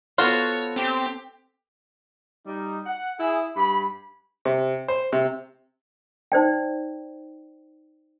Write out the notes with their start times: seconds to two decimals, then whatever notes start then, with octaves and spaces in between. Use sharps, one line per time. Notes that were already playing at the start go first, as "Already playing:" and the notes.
0.18 B3 F4 F#4 A4 C5 C#5
0.76 C4 G4
2.47 G3 D#4
2.86 F#5
3.20 E4 G#4
3.57 G2 B5
4.45 C3
4.88 C5
5.13 C3
6.32 D#4 C5 D5 G5